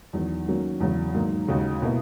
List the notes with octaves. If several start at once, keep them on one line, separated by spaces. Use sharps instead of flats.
E2 D#3 F#3
D#3 F#3 A#3 C#4 F#4
E2 C#3 F#3
G#2 D#3 F#3 A#3 D#4
D#2 C#3 G#3 D#4 F#4
B2 A#3 E4